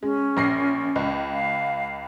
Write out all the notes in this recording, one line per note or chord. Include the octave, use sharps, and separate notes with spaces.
G#3 C#4
A#1 A#6 C7
C#2
F5